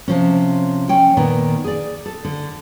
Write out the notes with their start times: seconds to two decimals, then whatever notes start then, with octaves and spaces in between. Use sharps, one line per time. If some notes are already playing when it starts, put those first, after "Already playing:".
0.08 C3 F3 C#4
0.89 C#4 G5
1.17 A#2 D#3 B3
1.64 G#4 D5
2.06 A4
2.25 D3